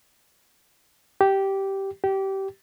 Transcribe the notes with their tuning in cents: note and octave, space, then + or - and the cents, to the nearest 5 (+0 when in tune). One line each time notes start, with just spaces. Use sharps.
G4 -10
G4 -20